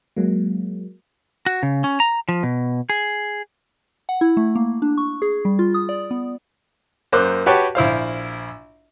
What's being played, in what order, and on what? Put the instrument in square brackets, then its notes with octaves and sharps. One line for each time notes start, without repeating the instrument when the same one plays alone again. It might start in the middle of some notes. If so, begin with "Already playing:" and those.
[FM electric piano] F#3 G#3 A#3
[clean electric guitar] F#4
C#3
C#4
A#5
F3
B2
G#4
[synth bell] F#5
E4
A3
A#3
D4
C#6
G#4
G3
F4
D#6
D5
B3
[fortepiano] F#2 A#3 C5 D6 F#6
F#4 G4 B4 C#5 G5 A5
A#1 E4 C5 F5